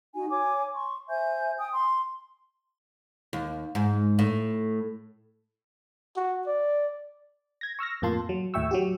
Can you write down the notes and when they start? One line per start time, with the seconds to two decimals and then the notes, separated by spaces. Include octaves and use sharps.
0.14 D#4 F#4 G#5
0.30 C#5 G#5 D6
0.73 C6 C#6
1.09 C5 E5 G#5 G6
1.58 G5 G#5 D#6
1.72 C6
3.33 D#2
3.75 G#2
4.19 A2
6.16 F#4
6.47 D5
7.61 G#6 A#6
7.79 C#6 E6 F6 A#6
8.02 F2 A2 A#3 F4 A5 C6
8.29 F#3
8.54 D#2 A2 E5 G5 C#6 E6
8.71 F#3 F#4 G4